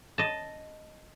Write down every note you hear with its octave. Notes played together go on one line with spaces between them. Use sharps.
D#5 A5